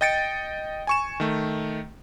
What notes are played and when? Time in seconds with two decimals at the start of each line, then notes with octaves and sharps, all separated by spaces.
0.01 D#5 G5 A6 C#7 D7
0.87 G#5 C#6 E7
1.20 D#3 A3